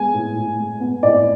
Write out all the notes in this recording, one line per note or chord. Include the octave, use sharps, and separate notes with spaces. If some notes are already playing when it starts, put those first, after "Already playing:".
Already playing: G#3 B3 G#5
A2
A2
G#3
B3
A2 D5